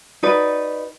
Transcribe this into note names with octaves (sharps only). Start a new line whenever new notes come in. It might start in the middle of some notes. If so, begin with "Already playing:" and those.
D#4 F#4 B4 D5